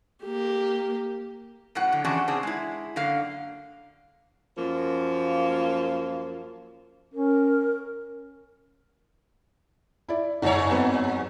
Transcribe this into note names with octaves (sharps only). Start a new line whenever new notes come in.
A#3 G4
F#2 A2 F#3 F#5
D3
F2 C#3 E3 C#4 D4 F#4
C#3 C4 D4 G#4
G#3 E4
F#2 D3 A#3 F5
F#2 F3 A#3
C#4 A#4
E4 D5
F#1 G2 C#5
F#3 B3 C4